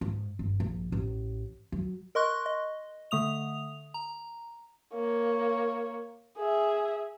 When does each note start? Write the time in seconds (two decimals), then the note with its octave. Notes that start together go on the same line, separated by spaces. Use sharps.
0.01 G#2
0.39 G1
0.60 A#1
0.92 A1
1.72 F#3
2.15 A#4 D#5 C6 C#6 F#6
2.46 D#5
3.11 D3 A3 D#6 F7
3.94 A#5
4.94 A#3 C#5
6.37 G#4 E5